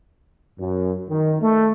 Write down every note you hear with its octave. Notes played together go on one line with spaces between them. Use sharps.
F#2
D#3
A3